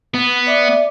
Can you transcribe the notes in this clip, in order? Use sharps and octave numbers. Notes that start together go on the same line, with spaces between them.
B3
D5 E5 D6